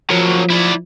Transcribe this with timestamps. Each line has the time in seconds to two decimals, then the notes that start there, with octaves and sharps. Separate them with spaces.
0.10 F3 F#3 A#3
0.50 E4 D5